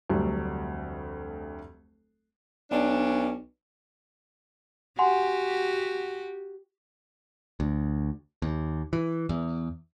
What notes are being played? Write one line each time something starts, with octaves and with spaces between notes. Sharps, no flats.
F1 D2 F#3 G3 D4
B1 C#4 D4
F#4 G4 F#5 G#5 C6
D2
D#2
E3
E2